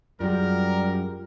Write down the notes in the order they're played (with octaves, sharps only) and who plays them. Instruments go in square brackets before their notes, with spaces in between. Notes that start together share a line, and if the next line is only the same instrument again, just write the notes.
[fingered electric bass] F#2 F#3 [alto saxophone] G3 [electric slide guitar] F4 G4 G#4 [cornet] A#4